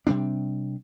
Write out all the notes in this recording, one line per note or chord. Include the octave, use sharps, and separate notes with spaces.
C3 G3 C4 D4